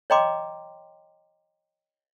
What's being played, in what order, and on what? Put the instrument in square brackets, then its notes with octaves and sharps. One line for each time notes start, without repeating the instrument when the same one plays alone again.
[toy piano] C#5 D#5 G5 A#5 C6 D6